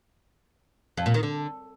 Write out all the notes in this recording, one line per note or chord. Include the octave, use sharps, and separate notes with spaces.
F2
A#2
D#3
D3